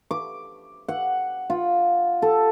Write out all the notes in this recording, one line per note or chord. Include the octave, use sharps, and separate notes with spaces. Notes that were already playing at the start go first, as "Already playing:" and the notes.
D6
F#5
F4
A4